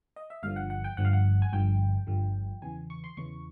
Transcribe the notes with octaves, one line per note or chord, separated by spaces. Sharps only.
D#5
E5
G1 G2 D3 F3 F5
F#5
F#5
G5
G1 G2 D3 F3 F#5
F5
F#5
G#5
G1 G2 D3 F3 G5
G1 G2 D3 F3
E2 C#3 E3 G#5
C#6
C6
E2 C#3 E3 C#6